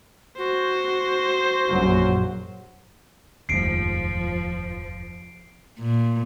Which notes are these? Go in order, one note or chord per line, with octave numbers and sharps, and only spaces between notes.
F#4 C5
A#1 F#2 F#3
F1 D#2 G#2 F3 C7 D7
A#2